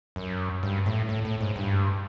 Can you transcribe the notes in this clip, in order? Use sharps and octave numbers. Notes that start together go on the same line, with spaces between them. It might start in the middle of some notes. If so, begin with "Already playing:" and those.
F#2
G2
A2
A2
A2
G#2
G2